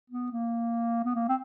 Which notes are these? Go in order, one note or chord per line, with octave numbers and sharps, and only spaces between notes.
B3
A#3
B3
A#3
C4